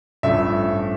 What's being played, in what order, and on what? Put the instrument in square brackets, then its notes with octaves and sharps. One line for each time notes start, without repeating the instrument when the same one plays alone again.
[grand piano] A1 G2 F3 A3 E5